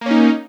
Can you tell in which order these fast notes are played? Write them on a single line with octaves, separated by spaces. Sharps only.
A#3 C#4 D#4